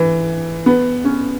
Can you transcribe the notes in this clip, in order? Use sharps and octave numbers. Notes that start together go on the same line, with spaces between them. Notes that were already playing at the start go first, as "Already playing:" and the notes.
Already playing: E3
B3
C#4